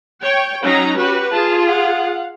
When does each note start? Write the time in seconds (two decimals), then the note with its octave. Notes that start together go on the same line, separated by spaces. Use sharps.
0.23 C#5 G5
0.63 F#3 C#4 D#4 A#5
0.98 F#4 G4 B4
1.32 F4 G#4 A5
1.67 F5 F#5